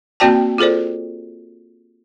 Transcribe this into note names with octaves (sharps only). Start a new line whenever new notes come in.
A#3 C4 F#4 D5 G5 A5
F4 G#4 A4 C5 D5